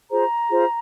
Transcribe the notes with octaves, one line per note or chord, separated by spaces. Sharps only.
F4 G#4 C5 A#5
F4 G#4 C5